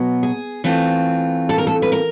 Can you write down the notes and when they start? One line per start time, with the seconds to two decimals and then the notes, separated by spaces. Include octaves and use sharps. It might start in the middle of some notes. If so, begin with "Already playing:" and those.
Already playing: B2 F#3 B3
0.23 G#4
0.64 E3 A3 C4 F4
1.49 A4
1.58 A#4
1.67 A4
1.82 B4
1.92 A#4